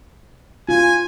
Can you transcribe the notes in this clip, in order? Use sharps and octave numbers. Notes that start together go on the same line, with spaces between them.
F4 G#5